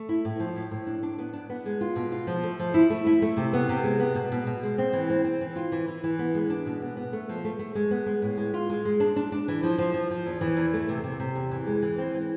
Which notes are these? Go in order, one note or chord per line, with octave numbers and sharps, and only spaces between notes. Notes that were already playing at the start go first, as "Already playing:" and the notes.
Already playing: A3
E4
A2
F3
A2
A2
D4
D4
B3
D4
B3
G#3
F4
B2
F4
F3
A3
F3
E4
A3
E4
A3
C3
B3
C3
G#3
B3
B2
B2
B2
G#3
C4
E3
C4
C4
E3
F4
E3
E3
E3
B3
G#3
D4
B2
B3
B3
A3
F3
A3
A3
G#3
B3
G#3
A2
G#3
F4
G#3
G#3
D4
D4
D4
E3
F3
F3
F3
F3
E2
E3
E2
A3
C3
C3
C3
E2
E3
G#3
E3
C4
E3